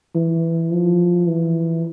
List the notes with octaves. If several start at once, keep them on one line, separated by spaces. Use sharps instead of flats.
E3
F3
E3